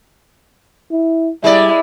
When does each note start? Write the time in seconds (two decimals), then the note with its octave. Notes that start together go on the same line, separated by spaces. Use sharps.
0.91 E4
1.44 G3 G#3 E4 D5